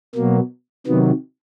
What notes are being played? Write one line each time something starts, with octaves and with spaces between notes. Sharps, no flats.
B2 F#3 A#3
C3 D#3 F#3 B3